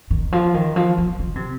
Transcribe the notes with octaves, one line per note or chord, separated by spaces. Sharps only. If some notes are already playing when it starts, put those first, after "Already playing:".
D#3
F3
D#3
F3
F3
D#3
C3